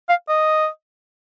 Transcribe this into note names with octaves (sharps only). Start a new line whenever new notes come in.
F5
D#5